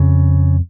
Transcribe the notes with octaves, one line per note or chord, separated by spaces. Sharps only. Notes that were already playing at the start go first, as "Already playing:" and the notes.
Already playing: F2 C#3